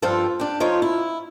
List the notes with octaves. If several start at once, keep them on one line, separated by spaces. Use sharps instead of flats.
G2 F3 C4 F4 A4
D4 G4
F3 D#4 F4 C#5
E4